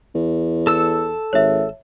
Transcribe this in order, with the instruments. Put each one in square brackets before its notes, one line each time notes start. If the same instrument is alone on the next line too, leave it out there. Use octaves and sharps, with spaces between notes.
[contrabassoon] E2
[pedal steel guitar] A4 E6
[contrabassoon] G#1 [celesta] C#5 E5